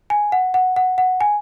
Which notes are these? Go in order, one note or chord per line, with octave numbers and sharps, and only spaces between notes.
G#5
F#5
F#5
F#5
F#5
G#5